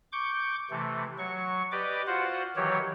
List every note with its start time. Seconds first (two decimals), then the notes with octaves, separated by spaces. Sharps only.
0.12 C#6 D6 G6
0.70 C3 E3 A3
1.19 F#3 C#6
1.72 G4 B4 D5 D#5 D6
2.07 F4 F#4 C5 F#5
2.56 D#3 E3 F#3 G4 C#5